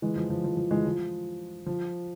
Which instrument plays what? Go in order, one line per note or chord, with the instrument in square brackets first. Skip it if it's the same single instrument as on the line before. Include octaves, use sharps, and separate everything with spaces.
[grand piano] E3 G#3
F3
F3
F3
F3
E3 G#3
F3
F3